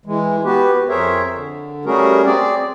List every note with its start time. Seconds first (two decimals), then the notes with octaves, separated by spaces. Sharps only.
0.06 E3 G#3
0.44 B3 F#4 G4 B4
0.89 F2 G#4 A#4 C5 C#5 E5
1.34 D3
1.85 G3 A3 C#4 F#4 G#4 A#4
2.25 C4 G#4 D5